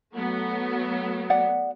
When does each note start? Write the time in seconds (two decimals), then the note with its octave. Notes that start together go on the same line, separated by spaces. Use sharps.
0.13 F#3 A3 B3
1.30 D5 F#5